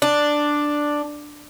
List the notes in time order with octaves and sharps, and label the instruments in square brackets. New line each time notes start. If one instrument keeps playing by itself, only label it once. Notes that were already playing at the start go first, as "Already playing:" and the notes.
[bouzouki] D4